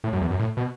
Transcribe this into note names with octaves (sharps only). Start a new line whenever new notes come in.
A2
F#2
E2
F#2
A2
B2